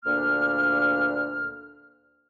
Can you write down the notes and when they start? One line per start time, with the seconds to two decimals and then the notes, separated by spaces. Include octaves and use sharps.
0.06 D2 A#2 A#3 D4 F6